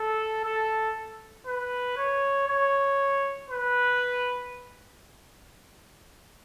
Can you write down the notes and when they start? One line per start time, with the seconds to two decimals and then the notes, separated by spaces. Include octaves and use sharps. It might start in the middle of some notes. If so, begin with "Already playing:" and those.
Already playing: A4
0.44 A4
1.46 B4
1.97 C#5
2.47 C#5
3.50 B4